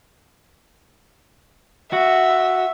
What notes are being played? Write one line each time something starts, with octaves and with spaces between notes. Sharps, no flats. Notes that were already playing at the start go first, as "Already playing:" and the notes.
F#4 E5